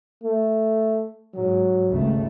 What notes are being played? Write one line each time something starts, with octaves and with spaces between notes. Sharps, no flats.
A3
G#2 F#3
G#1 C#2 A3